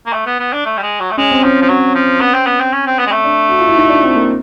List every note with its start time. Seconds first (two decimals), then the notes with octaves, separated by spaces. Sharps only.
0.06 A#3
0.13 A3
0.26 B3
0.40 B3
0.53 D4
0.66 A3
0.77 G3
0.82 G#3
1.00 F#3
1.11 A3
1.17 G#3 C#4
1.31 C4
1.43 F3 C#4
1.62 F3
1.69 F#3
1.95 F3
2.21 B3
2.34 C4
2.46 B3
2.60 C4
2.73 C#4
2.86 C4
2.99 B3
3.06 G#3
3.12 A3
3.24 D4
3.49 F#4
3.59 F4
3.68 E4
3.77 D#4
3.89 D4
4.03 C4
4.15 A#3